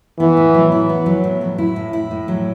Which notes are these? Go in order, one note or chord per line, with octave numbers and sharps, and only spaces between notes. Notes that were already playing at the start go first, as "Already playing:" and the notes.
E3 B3
A2
F#3
E4
B3
F#3
A2
F#3
E4
A2
E4
A2
F#3